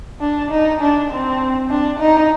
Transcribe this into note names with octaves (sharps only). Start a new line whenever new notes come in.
D4
D#4
D4
C4
D4
D#4